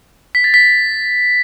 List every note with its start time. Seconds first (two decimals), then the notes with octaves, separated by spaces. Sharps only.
0.35 B6
0.44 A6
0.54 B6